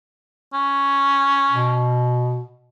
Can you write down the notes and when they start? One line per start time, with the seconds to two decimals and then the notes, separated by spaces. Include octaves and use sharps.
0.54 C#4
1.51 B2